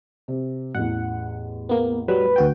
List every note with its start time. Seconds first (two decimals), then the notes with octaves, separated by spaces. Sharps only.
0.28 C3
0.75 A1 E2 F#5
1.69 A#3 B3
2.08 F#3 G3 B4
2.36 D2 F#4 G5